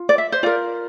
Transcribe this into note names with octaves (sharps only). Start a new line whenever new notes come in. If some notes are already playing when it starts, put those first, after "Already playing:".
Already playing: F4
D5
E5
C5
F4 A#4 D5